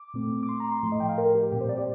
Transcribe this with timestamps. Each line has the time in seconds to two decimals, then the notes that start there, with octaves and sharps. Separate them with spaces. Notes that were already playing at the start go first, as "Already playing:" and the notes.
Already playing: D6
0.14 A#2 A3 C4
0.43 D6
0.49 C6
0.60 A#5
0.72 C6
0.83 A2 F3 A3 C6
0.92 D#5
1.00 G5
1.09 F5
1.18 A#4
1.35 G4
1.52 A#2 G3 C4 G4
1.61 C5
1.69 D5
1.78 G4